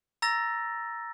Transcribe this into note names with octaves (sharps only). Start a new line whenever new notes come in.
A#5 E6 A6 A#6